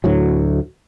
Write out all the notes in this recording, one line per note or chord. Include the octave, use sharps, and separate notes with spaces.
D2 A2 F#3